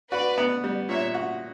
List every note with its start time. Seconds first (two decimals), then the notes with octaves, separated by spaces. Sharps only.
0.12 F#4 B4 D5
0.38 B3
0.64 G3
0.89 A#2 C#5 E5
1.14 F#4